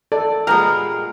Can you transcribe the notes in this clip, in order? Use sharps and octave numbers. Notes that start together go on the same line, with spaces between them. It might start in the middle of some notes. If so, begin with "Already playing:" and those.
A4 D5
A#2 G3 G#3 B3 G4 A#5 F6